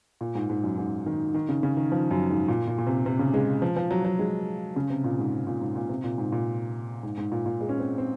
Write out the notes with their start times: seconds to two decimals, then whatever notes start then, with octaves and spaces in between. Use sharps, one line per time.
0.21 A#2
0.35 G#2
0.50 G#2
0.64 F#2
0.78 G#2
1.06 D#3
1.34 D#3
1.49 C#3
1.63 C#3
1.77 D#3
1.92 F3
2.11 F#2
2.30 G#2
2.48 A#2
2.67 A#2
2.78 A#2
2.86 C3
3.06 C3
3.19 C#3
3.34 G#3
3.62 F3
3.76 F3
3.91 F#3
4.05 F#3
4.19 G#3
4.76 C#3
4.90 C3
5.04 A#2
5.19 G#2
5.47 A#2
5.61 G#2
5.76 A#2
5.89 C3
6.04 A#2
6.18 G#2
6.32 A#2
7.03 G#2
7.18 G#2
7.32 A#2
7.46 A#2
7.61 G#3
7.69 C#4
7.79 C4
7.98 C4